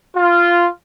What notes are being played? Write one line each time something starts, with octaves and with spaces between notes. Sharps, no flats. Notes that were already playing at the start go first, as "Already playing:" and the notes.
F4